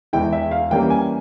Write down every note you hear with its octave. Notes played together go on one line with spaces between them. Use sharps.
E2 E3 G#3 E4 G5
E5
F5
E3 G3 A#3 C#4 G5
G#5